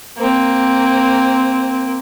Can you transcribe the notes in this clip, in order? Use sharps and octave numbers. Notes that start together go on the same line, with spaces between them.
A#3 C4